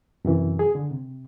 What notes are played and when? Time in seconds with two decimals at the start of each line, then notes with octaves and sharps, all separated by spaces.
0.25 F#2 C3 E3
0.59 G#4
0.75 D3
0.91 C3